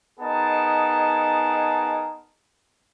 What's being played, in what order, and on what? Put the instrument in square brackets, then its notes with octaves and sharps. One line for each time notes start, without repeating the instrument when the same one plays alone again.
[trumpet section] B3 D#4 G#4 A#4 D#5 A5